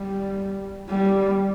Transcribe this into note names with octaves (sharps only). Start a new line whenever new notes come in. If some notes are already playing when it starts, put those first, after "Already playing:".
Already playing: G3
G3